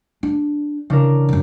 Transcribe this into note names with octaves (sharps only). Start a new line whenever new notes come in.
D4
C#3 E3 D4 A#4
F#2 C3